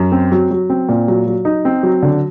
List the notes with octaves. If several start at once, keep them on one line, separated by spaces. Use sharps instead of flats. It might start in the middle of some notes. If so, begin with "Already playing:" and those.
Already playing: F#2
C4
F#3
F#3
C4
A#2
F#3
F#3
D#4
C4
F#3
D3